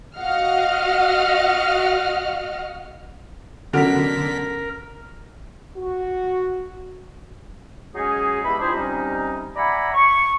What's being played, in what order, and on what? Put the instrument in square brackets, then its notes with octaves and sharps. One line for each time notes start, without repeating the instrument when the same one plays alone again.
[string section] F#4 D#5 F5 F#5 F6
[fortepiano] B2 F#3 [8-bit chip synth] D3 B6 [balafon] C#4 A4 F#5 [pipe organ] A#4
[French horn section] F#4
[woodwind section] F#3 G#3 C#4 D#4 G#4
E2 G#3 G4 E5 B5
D4 E4 F4 G4 G#4 C5
C3 G3 C#4 D#4
D5 E5 F#5 G#5 A#5 B5
C#6